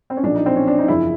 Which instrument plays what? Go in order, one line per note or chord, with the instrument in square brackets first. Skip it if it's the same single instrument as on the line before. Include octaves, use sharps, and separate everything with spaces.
[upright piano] C4
C#4
B1 A#2 F3 D4
D#4
C4
C#4
D4
D#4
F#1 E2 C#3 F3 E4